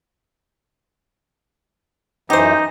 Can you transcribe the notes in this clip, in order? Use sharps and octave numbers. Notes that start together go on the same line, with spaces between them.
F#2 E3 D#4 G4 C5